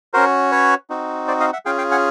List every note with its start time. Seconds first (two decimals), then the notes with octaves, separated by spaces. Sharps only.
0.13 C#4 F#4 A#4 C5
0.52 B4 C#5
0.90 C4 D#4 F#4
1.28 C5 D5
1.40 D#5 F5
1.53 E5 F#5
1.65 C#4 F4 G#4 F5 G5
1.78 F5 G5
1.91 F#5 G#5